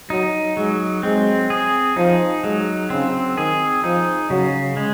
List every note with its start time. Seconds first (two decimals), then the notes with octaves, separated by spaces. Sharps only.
0.10 F#3 D#4
0.57 F#3 G#3
1.03 G#3 C4
1.50 G#4
1.97 F3 D#4
2.44 F#3 G#3
2.90 C#3 C4
3.37 D#3 G#4
3.83 F3 D#4
4.30 C#3 F#3
4.77 G#3